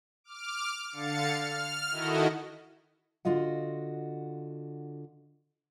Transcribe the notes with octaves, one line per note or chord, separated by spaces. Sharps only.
D6 F6
D3 F5 A6 C#7
F6
D#3 E4 F#4 A4 D#5
D3 F4 F#4 D#5 F#5